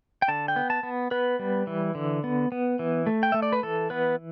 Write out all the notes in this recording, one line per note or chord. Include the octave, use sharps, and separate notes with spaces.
G5
D3 A5
G5
B3
A5
B3
B3 B4
G3
E3
D3
B3
B3
E3
A3
G5
A3 E5
D5
B4
E3 A4
B3 B4